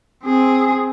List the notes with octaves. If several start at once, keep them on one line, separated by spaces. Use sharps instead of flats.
C4 G#4